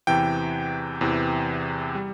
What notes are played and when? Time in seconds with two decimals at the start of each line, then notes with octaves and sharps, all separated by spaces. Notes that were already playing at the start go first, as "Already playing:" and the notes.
0.07 E2 C3 E3 G5
1.01 E2 C3 E3
1.95 G3